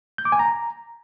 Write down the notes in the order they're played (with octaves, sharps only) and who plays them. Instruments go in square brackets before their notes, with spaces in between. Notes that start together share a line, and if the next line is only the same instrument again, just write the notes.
[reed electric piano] G6
D6
G#5
A#5